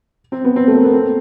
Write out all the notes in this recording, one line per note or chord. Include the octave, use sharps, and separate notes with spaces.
C4
B3
C4
A3
A#3
B3
C4